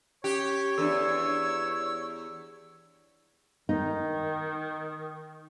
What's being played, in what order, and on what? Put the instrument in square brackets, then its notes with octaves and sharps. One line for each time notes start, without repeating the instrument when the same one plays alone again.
[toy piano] C#4 [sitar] G4 [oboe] C#5
[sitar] E2 [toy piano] D4 A4 [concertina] E6
[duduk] D#3 [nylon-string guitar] D#4